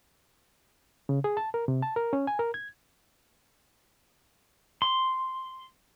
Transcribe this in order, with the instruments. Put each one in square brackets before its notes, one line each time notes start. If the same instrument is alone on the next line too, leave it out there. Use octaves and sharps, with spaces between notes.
[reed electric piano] C#3
G#4
A5
A#4
C3
A5
A#4
C#4
G#5
A#4
G#6
[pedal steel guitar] C6